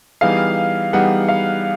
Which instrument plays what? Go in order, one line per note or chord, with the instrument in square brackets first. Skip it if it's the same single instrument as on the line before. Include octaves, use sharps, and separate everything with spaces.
[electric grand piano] E3 G3 B3 D#4 G#4 [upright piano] F5
[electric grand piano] E3 G3 B3 D#4 G#4 [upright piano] F#5
[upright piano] F5